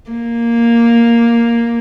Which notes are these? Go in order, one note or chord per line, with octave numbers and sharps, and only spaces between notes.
A#3